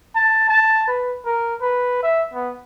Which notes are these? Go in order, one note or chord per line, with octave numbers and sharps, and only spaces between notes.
A5
A5
B4
A#4
B4
E5
B3